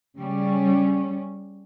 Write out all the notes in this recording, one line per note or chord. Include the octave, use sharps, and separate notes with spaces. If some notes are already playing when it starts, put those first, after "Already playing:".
C#3 G3 C#4